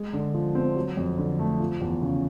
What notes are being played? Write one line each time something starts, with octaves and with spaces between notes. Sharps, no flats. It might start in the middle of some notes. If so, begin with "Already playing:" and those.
Already playing: G#3
D3
F3
C4
F#3
F2
D3
A3
F3
E2
C#3